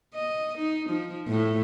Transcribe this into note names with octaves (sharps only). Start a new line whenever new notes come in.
D#5
D#4
F3
A2